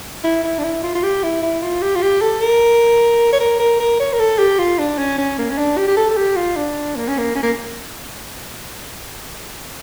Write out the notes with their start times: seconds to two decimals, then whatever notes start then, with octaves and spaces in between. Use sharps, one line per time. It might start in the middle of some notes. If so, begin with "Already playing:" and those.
0.24 E4
0.44 E4
0.59 D4
0.64 E4
0.83 F4
0.95 F4
1.03 G4
1.23 E4
1.43 E4
1.62 F4
1.82 G4
1.95 F4
2.02 G4
2.21 A4
2.41 A#4
3.33 C#5
3.40 A#4
3.59 A#4
3.80 A#4
3.99 C#5
4.13 A#4
4.19 A4
4.39 G4
4.59 F4
4.78 D4
4.98 C#4
5.18 C#4
5.38 A#3
5.50 C#4
5.58 D4
5.77 G4
5.88 G4
5.97 A4
6.10 A4
6.17 G4
6.36 F4
6.56 D4
6.96 A#3
7.08 C#4
7.18 A#3
7.35 C#4
7.43 A#3